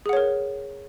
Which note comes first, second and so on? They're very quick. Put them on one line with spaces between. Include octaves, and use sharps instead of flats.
G#4 F#5 C#5 A#4